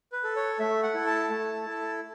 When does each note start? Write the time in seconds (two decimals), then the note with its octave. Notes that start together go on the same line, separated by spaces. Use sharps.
0.12 B4
0.24 A4
0.36 C#5
0.59 A3 E5
0.83 F#5
0.94 E4 A4
1.07 A5
1.30 A3
1.66 E4 A4